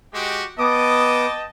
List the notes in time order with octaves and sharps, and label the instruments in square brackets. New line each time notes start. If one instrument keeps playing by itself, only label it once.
[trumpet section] G#3 F#4 G4
[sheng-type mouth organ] B3 D6 D#6 [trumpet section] D#5 G5 A5